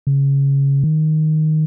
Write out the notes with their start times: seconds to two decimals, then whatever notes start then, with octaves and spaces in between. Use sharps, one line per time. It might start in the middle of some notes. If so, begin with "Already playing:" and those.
0.07 C#3
0.84 D#3